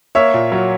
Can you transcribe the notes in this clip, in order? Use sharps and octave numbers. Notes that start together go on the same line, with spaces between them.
A#3 C#5 E5
A#2
F#3